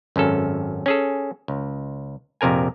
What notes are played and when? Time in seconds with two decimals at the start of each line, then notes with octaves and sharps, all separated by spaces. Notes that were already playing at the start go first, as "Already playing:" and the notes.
0.16 G#1 F#2 C#4 A4
0.86 C#4 G#4 A4
1.48 C#2
2.41 A#1 F2 C3 A#4 G#5